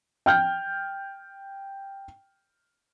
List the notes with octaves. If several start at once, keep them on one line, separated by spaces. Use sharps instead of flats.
G5 F6 G6